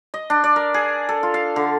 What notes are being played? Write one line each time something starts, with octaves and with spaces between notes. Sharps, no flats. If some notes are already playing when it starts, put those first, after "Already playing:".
D#5
D4
D5
A#4
G#4
A4
F4
F5
D3